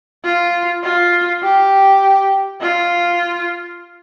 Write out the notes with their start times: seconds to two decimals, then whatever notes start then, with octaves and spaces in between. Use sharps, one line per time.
0.24 F4
0.84 F4
1.42 G4
2.61 F4